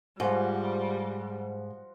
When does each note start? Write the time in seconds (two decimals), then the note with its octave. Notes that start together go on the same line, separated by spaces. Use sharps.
0.20 G#2 F3 G3 F#4